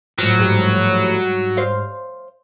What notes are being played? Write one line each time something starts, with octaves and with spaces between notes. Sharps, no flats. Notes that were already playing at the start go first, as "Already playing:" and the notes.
A2 F3 F#3
G#2 G3
C5 F5